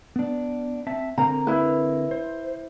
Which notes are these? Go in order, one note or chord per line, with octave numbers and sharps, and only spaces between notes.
B3 D4
C4 E5 A5
D3 C4 A#4 A#5
E4 B4
C5